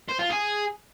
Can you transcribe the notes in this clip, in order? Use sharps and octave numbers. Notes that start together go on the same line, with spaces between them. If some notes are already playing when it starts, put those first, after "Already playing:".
C5
F4
G#4